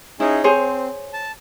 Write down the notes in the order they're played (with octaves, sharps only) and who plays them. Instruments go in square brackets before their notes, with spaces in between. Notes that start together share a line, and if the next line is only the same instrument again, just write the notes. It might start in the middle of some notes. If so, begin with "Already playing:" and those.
[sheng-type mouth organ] C#4 D#4 G#4 [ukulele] E4
[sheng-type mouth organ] C4 [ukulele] G#4 C5 C#5
[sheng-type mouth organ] A5